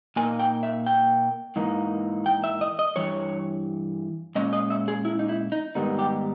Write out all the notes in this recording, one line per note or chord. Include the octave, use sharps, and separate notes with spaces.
A#2 A#3 D#4 G#5
G5
E5
G5
G#2 E3 A#3 D#4
G5
E5
D#5
D#5
G2 E3 C#5
A#2 G#3 C#4 D#5
D#5
E5
G#4
E4
D#4
E4
D#4
G#2 D#3 G3 B3 D#4
G4